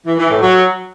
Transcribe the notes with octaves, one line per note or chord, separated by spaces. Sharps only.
E3
E3
A2
F#3